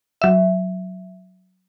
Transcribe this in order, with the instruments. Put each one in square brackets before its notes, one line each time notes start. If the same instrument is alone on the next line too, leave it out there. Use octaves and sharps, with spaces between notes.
[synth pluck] F#3 E5